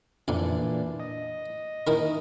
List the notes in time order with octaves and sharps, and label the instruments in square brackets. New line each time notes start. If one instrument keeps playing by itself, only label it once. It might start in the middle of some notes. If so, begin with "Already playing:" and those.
[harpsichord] F2 D3 [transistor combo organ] A#2 E3 D4
[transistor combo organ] D#5
[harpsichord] D#3 E4 A#4